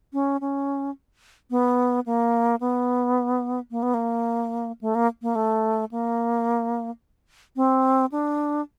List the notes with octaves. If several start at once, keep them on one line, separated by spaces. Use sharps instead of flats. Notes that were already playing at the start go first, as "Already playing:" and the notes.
C#4
C#4
B3
A#3
B3
A#3
B3
A#3
A3
A#3
A#3
A3
A#3
C4
D4